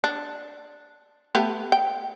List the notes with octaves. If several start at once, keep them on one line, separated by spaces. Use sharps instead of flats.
D4
A3 B3 G4
G5